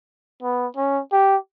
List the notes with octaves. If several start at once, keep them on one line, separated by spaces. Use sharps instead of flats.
B3
C#4
G4